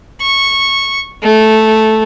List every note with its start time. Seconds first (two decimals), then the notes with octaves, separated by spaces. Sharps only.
0.21 C#6
1.22 A3